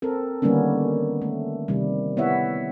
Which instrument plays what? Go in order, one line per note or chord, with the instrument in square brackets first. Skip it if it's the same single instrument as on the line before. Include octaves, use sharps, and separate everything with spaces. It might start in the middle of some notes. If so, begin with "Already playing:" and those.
[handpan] C4 A4 A#4
D3 D#3 G3 A#3 B3 C#4
A3
C3 D#3 G3
B3 E4 C#5 E5 F#5